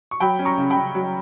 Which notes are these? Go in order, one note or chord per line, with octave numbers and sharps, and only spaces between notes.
C#6
F#3 G5 B5
C#4
A#5 C#6
C#3
G5 B5
C#3
F#3